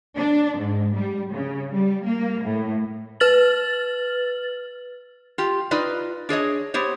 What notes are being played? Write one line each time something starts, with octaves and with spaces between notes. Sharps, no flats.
D4
G#2
G3
C#3
G3
A#3
A2
B4 F6 A6 F#7
F4 G4
D#4 F4 B4 D5
D4 G#4 C#5 D#5
B3 G4 C5 C#5